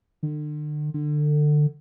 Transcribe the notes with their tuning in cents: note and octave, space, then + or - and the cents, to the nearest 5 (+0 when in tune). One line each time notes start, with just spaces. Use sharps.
D3 +40
D3 +25